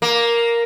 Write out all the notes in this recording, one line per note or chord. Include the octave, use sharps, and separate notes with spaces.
A#3